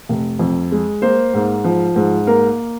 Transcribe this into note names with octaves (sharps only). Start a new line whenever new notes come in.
F1
F2
G#3
A#3 C5
G#2
F3
G#2
A#3 A#4